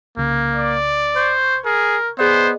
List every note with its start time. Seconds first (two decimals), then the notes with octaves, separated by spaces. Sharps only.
0.17 C2 C#3 A#3
0.55 D5
1.16 C5 C#6 G6 G#6
1.65 G#4 A#4
2.18 B3 G#4 C5 D5 D#5